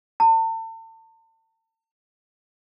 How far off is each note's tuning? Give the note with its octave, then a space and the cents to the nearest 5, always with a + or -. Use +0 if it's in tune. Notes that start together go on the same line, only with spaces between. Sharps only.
A5 +40